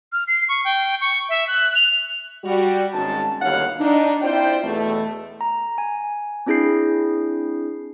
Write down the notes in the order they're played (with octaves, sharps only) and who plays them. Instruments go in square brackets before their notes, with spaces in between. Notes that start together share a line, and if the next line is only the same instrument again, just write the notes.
[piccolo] F6
C7
C#6
G5
C#6
E5
F#6
F7
[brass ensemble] G3 F#4
G#1 G#2 C#4 A5
G1 D#2 B2 C#5 F5 F#5
D4 D#4
C4 E4 F4 C5 D5 G5
E2 B2 A3
[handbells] A#5
G#5
C4 D4 E4 G#4 G6 C7